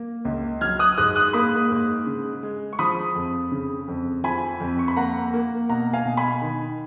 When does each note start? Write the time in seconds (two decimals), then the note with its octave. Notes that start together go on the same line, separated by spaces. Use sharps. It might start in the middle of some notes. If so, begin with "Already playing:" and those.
Already playing: A#3
0.25 C#2
0.61 F#3 F6 G#6
0.79 D#6 F#6
0.97 G#2 D#6 F#6
1.16 D#6 F#6
1.33 A#3 B5 D#6
1.70 G#2
2.06 C#3
2.43 G#3
2.73 C#6
2.79 F3 B5 D#6
3.15 F2
3.52 C#3
3.88 F2
4.24 F3 G#5 B5
4.60 F2
4.79 C#6
4.88 B5
4.96 A#3 F#5 A#5
5.34 A#3
5.69 B2 F#5 A#5
5.93 F5 G#5
6.05 B2
6.17 G#5 B5
6.42 D#3